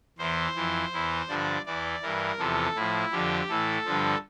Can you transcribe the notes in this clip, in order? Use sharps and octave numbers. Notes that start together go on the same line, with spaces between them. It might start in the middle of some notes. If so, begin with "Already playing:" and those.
E2 E3 C5
F2 E3
E2 E3
G2 D3 F3 D5
E2 E3 D5
G2 E3 A#4
E2 C3 F3 A4
A2 F3 E4
F2 D3 F3 G4
A2 E3 A4
G2 D3 F3